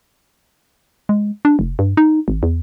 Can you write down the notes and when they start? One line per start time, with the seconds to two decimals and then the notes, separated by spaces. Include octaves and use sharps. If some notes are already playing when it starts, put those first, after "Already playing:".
1.09 G#3
1.45 D4
1.59 F1
1.79 G2
1.97 D#4
2.28 G#1
2.43 E2